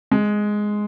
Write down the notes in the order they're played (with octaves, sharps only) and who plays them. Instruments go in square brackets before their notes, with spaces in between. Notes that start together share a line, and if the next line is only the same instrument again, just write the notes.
[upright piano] G#3